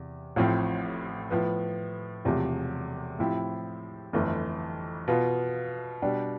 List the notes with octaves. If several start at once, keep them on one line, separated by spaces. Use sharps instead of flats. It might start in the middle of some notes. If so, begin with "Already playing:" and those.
Already playing: E2 C3
A1 A2 F3 C4
A2 F3 B3
E1 E2 C3 F3 A3
A2 F3 C4 E4 G4
G1 F2 E3 A3
B2 B3 F4
B2 G3 D4 G4